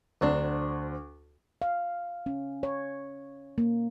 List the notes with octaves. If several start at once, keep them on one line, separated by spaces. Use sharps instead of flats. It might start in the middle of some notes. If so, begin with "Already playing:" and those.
D2 F#3 C4 D4
F5
C#4
C#5
A#3